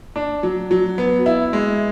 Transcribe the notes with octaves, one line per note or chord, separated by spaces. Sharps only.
D4
F#3
F#3
B3
E4
G#3